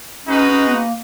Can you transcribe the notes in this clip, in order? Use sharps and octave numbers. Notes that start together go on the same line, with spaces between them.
G#3 C#4 D#4 F#4 B4
C#4
B3
A#3